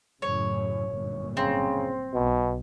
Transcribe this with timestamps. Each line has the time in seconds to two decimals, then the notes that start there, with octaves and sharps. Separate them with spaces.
0.22 F#2 A2 C#3 C#5
0.88 G1 F#2 A#2
1.37 C#3 C4
2.14 B1 B2